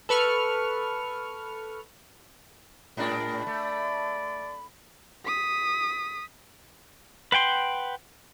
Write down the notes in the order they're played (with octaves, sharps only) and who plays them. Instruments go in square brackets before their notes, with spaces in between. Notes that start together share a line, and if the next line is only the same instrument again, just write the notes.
[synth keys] A4 B4 C#6 F6
[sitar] A2 G#3 D4 [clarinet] A#4 [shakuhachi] B5
[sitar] A3 [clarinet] D5
[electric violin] D#6 B6
[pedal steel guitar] B4 F#5 G5 C6